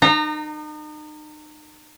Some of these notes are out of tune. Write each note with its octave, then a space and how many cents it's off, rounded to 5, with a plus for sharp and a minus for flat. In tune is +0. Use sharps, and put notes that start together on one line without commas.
D#4 -35 A#5 -15